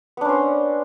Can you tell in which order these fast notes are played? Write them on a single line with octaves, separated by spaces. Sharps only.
B3 D4 C#4 C5